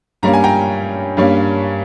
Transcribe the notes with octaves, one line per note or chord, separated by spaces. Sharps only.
G2 G3 A#3 C#4 A#5
G#5
G5 A#5
G2 G3 A#3 C#4